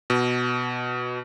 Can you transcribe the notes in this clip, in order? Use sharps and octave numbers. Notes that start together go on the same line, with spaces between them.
B2